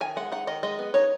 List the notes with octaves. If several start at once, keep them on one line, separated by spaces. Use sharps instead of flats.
D#3 G#5
G#3 F#5
D#4 F#5
D#3 D#5
G#3 D#5
B3
D#4 C#5